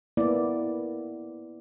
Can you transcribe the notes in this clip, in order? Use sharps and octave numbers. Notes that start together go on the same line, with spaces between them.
A#3 B3 E4 D5